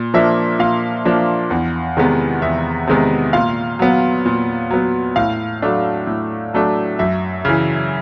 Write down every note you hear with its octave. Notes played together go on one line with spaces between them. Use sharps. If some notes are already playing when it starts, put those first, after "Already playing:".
Already playing: A#2
F3 A#3 D4 E5
A#2 F5
F3 A#3 D4
E2
C3 D#3 G#3 B3
E2 E5
C3 D#3 G#3 B3
A#2 F5
F#3 B3
A#2
F#3 B3
A2 F5
F#3 A3 D4
A2
F#3 A3 D4
F#2 E5
C#3 E3